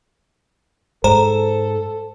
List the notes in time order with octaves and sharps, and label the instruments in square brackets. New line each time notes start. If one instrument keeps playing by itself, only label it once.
[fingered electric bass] G#2 [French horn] A4 [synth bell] C5 [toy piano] A#5